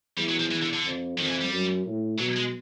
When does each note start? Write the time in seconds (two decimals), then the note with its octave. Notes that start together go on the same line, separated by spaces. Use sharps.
0.17 E2 G3
0.29 F#3
0.39 F3
0.51 E3
0.62 D3
0.73 D3
0.85 F2
1.18 F2 D#3
1.25 F3
1.30 E3
1.41 G3
1.52 F#2
1.86 A2
2.19 B2 F#3
2.36 G#3